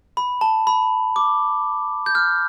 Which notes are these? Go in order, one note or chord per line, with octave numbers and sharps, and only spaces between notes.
B5
A5
B5
D6
G6
F6